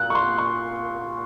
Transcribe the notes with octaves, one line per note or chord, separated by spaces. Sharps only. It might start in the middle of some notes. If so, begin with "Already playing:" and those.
Already playing: A#2 F#6
C#6
C6
C#6